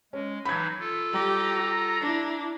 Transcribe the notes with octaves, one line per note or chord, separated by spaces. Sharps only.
G#3 C#4
E3 F#3 D#4 B5 G#6
F4 A4
G3 G4 A#5
D4 E4